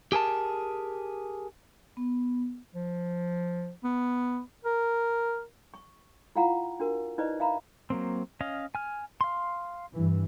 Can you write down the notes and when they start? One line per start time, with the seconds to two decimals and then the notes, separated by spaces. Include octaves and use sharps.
0.12 G4 G#4 A#4 A5
1.97 B3
2.75 F3
3.84 B3
4.65 A#4
5.74 C#6
6.36 E4 F4 F5 F#5 A#5
6.80 D4 F#4 A#4
7.18 D#4 E4 B4 C5 D5 D#5
7.40 E5 F5 A#5 B5
7.90 F#3 A#3 C4
8.41 C#4 D#5 F5
8.75 G#5 F6
9.21 F5 C6
9.92 G2 E3